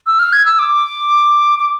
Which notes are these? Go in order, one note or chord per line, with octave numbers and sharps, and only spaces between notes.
E6
F6
G#6
E6
D6
D6